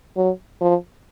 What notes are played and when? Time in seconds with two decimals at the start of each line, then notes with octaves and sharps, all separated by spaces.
0.17 F#3
0.61 F3